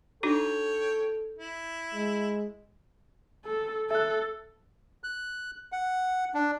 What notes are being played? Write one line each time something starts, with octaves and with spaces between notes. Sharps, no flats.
D4 D#4 F#4 A4 C#5 G5
E4
G#3
A4
A4 E5 F#6
F#6
F#5
D4